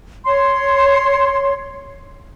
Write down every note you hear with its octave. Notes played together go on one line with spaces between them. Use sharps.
C#5 C6